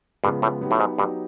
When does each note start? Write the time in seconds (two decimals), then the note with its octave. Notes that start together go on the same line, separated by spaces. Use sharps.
0.24 G2 C#3 F3 G#3 B3
0.42 A2
0.61 F#3 B3 D#4 G4
0.71 A2
0.80 G#2
0.98 G2 F#3 B3 D#4 G4